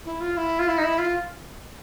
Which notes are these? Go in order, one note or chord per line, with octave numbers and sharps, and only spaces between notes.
E4
F4
E4
F4
E4
D#4
E4
F4